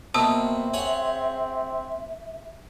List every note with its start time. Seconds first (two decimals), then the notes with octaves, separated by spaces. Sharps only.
0.14 B2 A#3 C4 E5 A5 D#6 E6
0.74 G#4 C#5 F#5